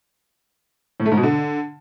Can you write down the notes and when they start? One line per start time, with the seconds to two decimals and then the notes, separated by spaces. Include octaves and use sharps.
1.00 A2
1.06 A3
1.11 G#2
1.17 B2
1.23 D3